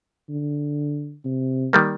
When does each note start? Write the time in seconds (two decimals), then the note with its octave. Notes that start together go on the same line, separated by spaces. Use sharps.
0.29 D3
1.25 C3
1.73 D#3 G3 A#3